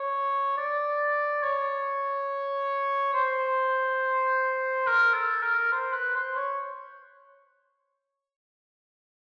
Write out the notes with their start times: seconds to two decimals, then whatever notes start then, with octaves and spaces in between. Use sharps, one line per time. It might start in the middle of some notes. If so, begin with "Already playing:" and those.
Already playing: C#5
0.57 D5
1.43 C#5
3.14 C5
4.86 A#4
5.14 A4
5.43 A#4
5.72 C5
5.93 B4
6.15 C5
6.36 C#5